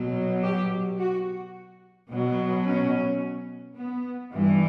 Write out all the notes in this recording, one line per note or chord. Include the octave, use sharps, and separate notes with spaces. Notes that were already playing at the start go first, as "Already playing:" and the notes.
Already playing: B2 F#3
G4
F#4
B2 F#3
C#4
B3
G2 E3 G3